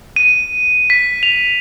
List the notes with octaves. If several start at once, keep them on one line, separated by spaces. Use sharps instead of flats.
D#7
B6
F7